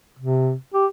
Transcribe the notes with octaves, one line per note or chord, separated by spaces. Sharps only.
C3
G4